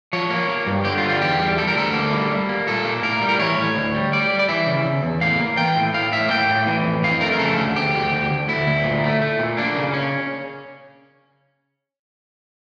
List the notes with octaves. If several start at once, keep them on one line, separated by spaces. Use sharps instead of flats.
F3 C#5
A#3
A#3
G2
D3 G4
F4
G3
F4
E2 G4
G3
G3 A4
A#4
D2 A4
A#3
G3
G3
A#3
A#2 A4
A#3
A2 A#4
G3
A#4
E3 C#5
A2
D2
G3
G3 D5
G3
D5
E3 E5
C#3
C#3
E2
A2 F5
A#3
E3 G5
A2
A2 F5
A2 E5
A#3 G5
A2
E3
F2
F2 F5
A3 A#4
A#4
C#3 A4
D2
D2 G4
D2
D2
D2
D2 E4
D2
A#2
A3
A3
A#2
A#3 D4
C#3
C#4